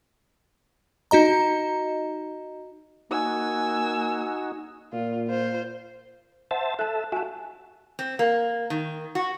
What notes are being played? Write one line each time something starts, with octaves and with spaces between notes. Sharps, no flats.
D#4 F#4 D#5 A#5
A#3 D#4 F#4 G#5 E6
A#2 F4
F4 C5
C5 E5 F#5 A5
A4 E5 A5 F#6
F#4 E5 G#5 A5
C4
A#3
D#3
F#4